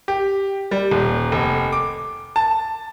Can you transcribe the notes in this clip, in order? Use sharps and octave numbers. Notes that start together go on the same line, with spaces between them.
G4
G3
D#1
F1
D6
A5